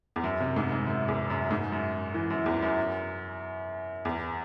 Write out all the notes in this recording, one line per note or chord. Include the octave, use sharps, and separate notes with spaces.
E2
F#2
C3
G#2
G#2
F#2
E2
F#2
G#2
F#2
E3
F#2
E2
F#2
E2